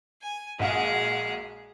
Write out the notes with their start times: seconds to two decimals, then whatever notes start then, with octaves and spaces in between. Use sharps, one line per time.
0.22 G#5
0.59 A#1 G#3 F#4 G#4 F5